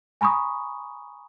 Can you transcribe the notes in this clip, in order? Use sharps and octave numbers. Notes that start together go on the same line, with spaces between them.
G#5 A#5 B5 C#6 D#6